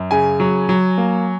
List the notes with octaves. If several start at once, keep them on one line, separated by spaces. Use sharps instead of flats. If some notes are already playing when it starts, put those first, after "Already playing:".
Already playing: F#2
C#3 G#5
F#3
F#3
A#3